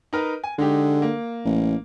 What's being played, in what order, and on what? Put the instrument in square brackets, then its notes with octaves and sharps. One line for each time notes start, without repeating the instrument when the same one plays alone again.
[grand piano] D#4 A#4 B4
G#5
[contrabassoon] D3 [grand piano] G#3 D#4 G4
[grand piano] A#3
[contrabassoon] A1